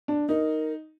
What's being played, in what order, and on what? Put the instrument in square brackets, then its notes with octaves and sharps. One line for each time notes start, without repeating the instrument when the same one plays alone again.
[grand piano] D4
[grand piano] D#4 [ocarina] A#4